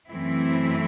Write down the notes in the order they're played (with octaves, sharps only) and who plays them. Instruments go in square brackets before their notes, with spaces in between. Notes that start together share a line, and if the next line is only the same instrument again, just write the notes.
[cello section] F#2 E3 A3 C4 E4